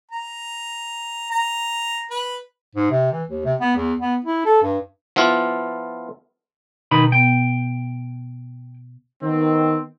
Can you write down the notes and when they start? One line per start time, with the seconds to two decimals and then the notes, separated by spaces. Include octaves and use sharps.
0.12 A#5
1.31 A#5
2.11 B4
2.75 G#2
2.91 C3
3.12 E3
3.28 D#2
3.45 C3
3.60 B3
3.76 E2
4.00 B3
4.25 E4
4.45 A4
4.62 G2
5.16 F3 B3 E4 F4
6.91 B2 D#3 D#4 B5
7.12 B3 G5
9.22 D#3 B3 C4